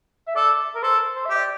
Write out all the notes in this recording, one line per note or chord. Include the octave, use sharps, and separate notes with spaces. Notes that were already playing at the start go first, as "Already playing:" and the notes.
E5
A4 D5
A#4
A4 C5
C5
G4 E5
D5